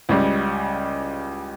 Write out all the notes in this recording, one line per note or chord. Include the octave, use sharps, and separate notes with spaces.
C#2 C#3 G3